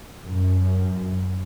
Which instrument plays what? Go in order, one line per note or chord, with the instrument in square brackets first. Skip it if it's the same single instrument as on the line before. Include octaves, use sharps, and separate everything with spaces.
[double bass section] F#2